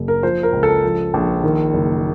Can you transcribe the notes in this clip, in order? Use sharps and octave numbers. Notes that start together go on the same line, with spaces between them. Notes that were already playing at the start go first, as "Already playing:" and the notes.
Already playing: F#1
A#4
F3 C5
A#4
C#2
A4
F3
A#1
D#3
F#1